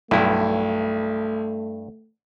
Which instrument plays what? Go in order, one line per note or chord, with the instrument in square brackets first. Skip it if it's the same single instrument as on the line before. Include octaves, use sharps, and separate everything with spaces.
[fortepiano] B1 [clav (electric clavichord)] G2 E4 [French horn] A3